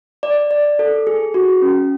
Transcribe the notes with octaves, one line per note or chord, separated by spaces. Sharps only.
D5
D5
A4
G#4
F#4
C#4